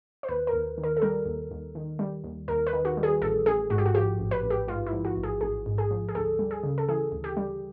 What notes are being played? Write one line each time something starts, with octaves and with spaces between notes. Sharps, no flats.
C5
D#2 B4
A#4
D#2
D#3
A#4
A4
G3 A#4
D#2
D#2
D#3
G3
D#2
D#2 A#4
B4
D#3
F#4
G3
G#4
A1 A4
A1 G#4
G#2 F#4
G4
F#4
F3 G4
A1
B4
A1
G4
G#2 F4
E4
F3
F#4
A1
G#4
A1 G#4
G#2
G#4
F3
G#4
D2 A4
G3
G#4
C#3
A4
E3 G#4
D2
G4
G3